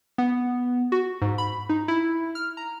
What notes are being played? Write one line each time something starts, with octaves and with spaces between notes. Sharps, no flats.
B3
F#4
G#2
B5
D#4
E4
F6
A#5